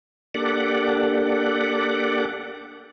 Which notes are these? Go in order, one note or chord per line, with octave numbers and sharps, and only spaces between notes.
A#3 D4 G4 A4 D5 F#5